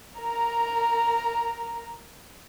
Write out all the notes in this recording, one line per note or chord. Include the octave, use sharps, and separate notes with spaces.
A#4 A#5